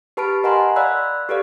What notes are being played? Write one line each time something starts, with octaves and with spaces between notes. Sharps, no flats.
G4 B4 A5 B5 F6 D7
A#4 D#5 F#5 G#5 A#5 C6
D5 F5 B5 E6 F#6
G4 A4 B4 D5 F5